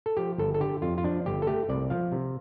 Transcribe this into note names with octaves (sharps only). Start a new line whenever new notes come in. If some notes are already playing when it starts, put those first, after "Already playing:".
A4
F3 G4
G1 A4
A4
D3 G4
F2 F4
F4
F3 D4
G1 G4
A4
A3 G4
C2 D5
F3 F5
C3